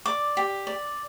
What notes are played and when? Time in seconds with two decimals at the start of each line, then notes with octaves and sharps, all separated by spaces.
0.06 D5 D6
0.37 G4
0.67 D5